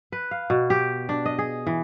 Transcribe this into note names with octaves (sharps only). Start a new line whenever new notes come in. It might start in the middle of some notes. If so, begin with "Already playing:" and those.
B4
F5
B2
G4
D4
D#5
G#4
E3